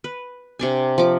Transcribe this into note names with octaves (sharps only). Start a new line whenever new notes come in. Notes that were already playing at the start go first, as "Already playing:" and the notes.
B4
C3 D4 G#5
F3 D6